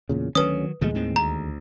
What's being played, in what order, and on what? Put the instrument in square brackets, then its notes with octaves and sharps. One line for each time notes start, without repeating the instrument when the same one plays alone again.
[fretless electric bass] E2 A#2 C#3
[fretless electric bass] D2 C#4 [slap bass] D#3 F#3 [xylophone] B4 D#6
[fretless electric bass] D#2 G#3 [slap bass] B2 F3 A3
[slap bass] A2 D#3 C4
[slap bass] D2 [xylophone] A#5